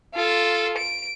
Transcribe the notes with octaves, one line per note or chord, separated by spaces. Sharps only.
F4 A4
D7